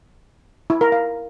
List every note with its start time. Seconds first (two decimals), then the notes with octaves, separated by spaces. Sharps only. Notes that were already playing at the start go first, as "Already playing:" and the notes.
0.70 E4
0.81 A#4
0.92 F5